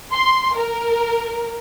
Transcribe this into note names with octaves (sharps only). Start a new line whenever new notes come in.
C6
A#4